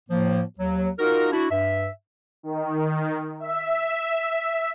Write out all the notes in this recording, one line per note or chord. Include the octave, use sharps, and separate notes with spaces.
A2 F3 A#3
D#2 F#3
D#4 F4 F#4 A#4
D4 E4 F#4
G2 E5
D#3
E5